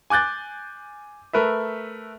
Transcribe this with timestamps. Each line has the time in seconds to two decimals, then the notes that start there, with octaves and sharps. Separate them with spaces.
0.10 G#5 D6 F#6 G6 A6
1.33 A3 A#4 B4 E5